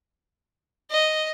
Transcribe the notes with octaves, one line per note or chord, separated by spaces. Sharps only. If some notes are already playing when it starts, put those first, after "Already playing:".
D#5